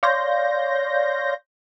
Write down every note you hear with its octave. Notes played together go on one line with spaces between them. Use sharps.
C#5 D5 F5 C6 G6 A#6